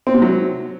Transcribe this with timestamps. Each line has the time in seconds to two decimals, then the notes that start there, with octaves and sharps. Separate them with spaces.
0.07 C4
0.14 C3
0.22 F#3